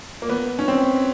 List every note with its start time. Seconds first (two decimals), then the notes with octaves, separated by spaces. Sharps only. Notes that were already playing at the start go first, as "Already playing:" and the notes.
0.22 A#3
0.29 B3
0.59 C#4
0.68 C4